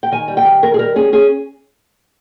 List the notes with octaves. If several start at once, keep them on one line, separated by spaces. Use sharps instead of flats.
G5
D#3 G#5
G3
G5
D#3
D#3 A#4
G#4
G3 A#4
C#4 G#4
C#4 G#4